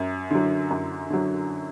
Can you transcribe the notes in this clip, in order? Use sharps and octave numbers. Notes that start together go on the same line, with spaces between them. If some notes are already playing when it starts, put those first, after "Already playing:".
Already playing: F#2
D3 F#3
F#2
D3 F#3